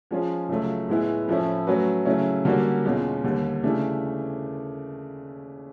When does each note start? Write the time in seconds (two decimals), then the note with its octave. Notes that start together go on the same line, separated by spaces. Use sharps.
0.11 F3 G#3 C#4 F4 G#4
0.49 C#2 C#3 F#3 A3
0.88 A2 E3 G#3 B3 E4
1.28 A2 F3 A3 C#4 E4
1.67 F#3 A3 C#4 F#4 B4
2.06 C#3 F#3 A3 C#4 E4
2.45 D3 G3 A#3 C#4 F#4
2.85 E2 B2 G#3 C#4 F4
3.24 D#2 D3 G3
3.63 C#3 E3 A3 D4 G4